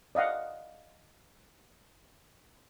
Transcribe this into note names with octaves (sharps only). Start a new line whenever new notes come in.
D5 D#5 F5 F#5